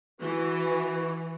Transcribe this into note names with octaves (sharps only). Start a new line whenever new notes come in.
E3 F#4 B4